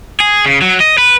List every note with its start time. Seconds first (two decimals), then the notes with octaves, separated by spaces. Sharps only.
0.20 G#4
0.46 C#3
0.62 F#3
0.80 D#5
0.98 B4